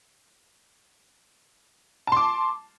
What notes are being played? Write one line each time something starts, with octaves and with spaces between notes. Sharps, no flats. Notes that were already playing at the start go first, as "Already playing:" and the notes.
A5 C6 D6